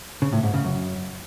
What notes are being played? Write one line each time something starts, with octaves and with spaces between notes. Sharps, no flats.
C#3
A2
G#2
C#3
F#2